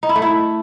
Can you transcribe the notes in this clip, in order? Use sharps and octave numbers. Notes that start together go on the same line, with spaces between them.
D#4
E4
A3
E4